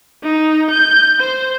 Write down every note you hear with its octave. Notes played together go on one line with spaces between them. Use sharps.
D#4
G6
C5